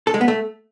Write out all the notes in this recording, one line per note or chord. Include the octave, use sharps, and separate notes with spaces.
A4
G#3
B3
A3